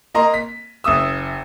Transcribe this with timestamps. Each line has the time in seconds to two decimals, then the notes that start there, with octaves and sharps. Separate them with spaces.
0.14 A#3 D#5 A#5 C6
0.34 B6
0.84 F#1 E5 D#6 E6